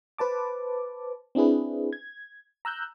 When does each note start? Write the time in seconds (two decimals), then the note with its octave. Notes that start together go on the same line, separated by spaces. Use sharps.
0.18 B4 C5 A5 D6
1.35 C4 D4 E4 G#4 B4
1.93 G#6
2.65 A#5 E6 F#6 G6